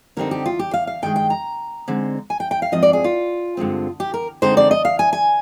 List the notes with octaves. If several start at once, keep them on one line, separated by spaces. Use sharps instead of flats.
D3 G3 C4 D#4 A#4
G4
F4
G4
F5
F5
G2 D#3 G#3 G5
G5
A#5
D3 G#3 C4 D#4
G#5
G5
G5
F5
G#2 F3 C4 F4 D#5
D5
G#4
F4
G2 D3 G#3 C4
G4
A#4
D3 G#3 C4 D#4 C5
D5
D#5
F5
G#5
G#5